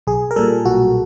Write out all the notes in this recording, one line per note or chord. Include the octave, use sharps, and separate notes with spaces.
B1 G#4
A#4
A#2 G3 A4
B1 F#4